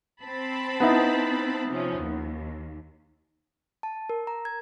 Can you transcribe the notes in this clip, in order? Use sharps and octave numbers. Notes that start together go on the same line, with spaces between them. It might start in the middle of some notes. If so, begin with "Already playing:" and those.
C4 A5 B5
B3 D#4 E4
C3 F3 C#4
D#2
A5
A#4
A#5
G#6